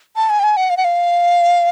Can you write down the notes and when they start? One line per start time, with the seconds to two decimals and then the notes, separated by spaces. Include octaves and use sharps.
0.16 A5
0.30 G#5
0.39 G5
0.43 G#5
0.57 F#5
0.70 F5
0.77 F#5
0.84 F5